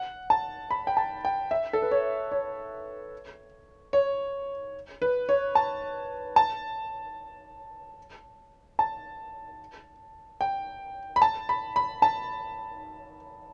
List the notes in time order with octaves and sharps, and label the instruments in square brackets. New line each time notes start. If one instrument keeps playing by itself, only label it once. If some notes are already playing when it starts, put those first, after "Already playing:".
Already playing: [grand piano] F#5
A5
B5
G5
A5
G5
E5
A4
B4
C#5
C#5
C#5
B4
C#5
A5
A5
A5
G5
B5
A5
B5
B5
A5